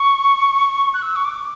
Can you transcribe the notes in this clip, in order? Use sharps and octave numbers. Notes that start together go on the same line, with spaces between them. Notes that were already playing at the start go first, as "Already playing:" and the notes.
Already playing: C#6
F#6
E6
C#6
D6